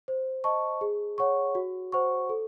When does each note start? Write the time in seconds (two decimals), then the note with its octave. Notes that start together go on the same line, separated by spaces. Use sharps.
0.08 C5
0.44 D#5 A5 C#6
0.81 G#4
1.18 C#5 F#5 C#6
1.55 F#4
1.92 C5 F#5 C#6
2.29 A4